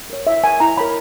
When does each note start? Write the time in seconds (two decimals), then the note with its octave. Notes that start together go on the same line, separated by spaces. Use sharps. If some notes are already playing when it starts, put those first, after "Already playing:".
0.10 A#4 C#5
0.27 E4 E5
0.44 A#4 C#5 G#5
0.60 E4 A#5
0.77 A#4 C#5 B5